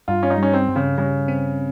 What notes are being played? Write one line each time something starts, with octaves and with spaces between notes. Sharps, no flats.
G2 F4
C#4
D#4
G3 C#4
C4
G2
C#3
C#3 G3
C4